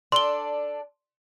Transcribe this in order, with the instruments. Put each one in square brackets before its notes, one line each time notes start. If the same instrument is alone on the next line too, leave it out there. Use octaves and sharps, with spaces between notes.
[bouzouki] D4 A4 [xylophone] C6 G7